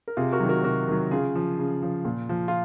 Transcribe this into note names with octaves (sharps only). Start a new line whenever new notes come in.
A#4
C3 F4 G#4
F#4 A#4
D#3 F#3
F#4 A#4
C3 F#4 A#4
D#3 F#3
C#3 F4 G#4
F3
C#3
F3
A#2
F3
F4